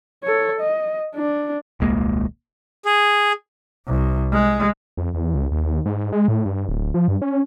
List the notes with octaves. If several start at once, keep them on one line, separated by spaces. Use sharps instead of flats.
A4 C#5
D#5
D4
D#1 C2 G#3 A#3
G#4
C2
G#3
F2
E2
C#2
D#2
G#2
G#3
A2
G2
D1
F3
G2
C#4